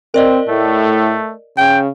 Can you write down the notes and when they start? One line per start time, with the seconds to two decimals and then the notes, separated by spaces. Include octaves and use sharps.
0.14 C4 A#4 D5 D#5
0.48 A2 A3
1.58 C#3 G5